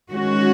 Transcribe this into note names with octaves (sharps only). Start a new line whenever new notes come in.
D#3 G#3 C#4 F#4